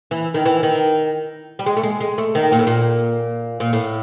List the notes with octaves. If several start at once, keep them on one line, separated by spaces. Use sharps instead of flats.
E3
D#3
E3
D#3
G3
G#3
A3
G#3
G#3
A3
D#3
A#2
A2
A#2
A#2
A2